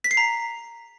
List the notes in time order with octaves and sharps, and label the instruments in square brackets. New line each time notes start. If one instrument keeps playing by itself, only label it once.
[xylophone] B6
C7
A#5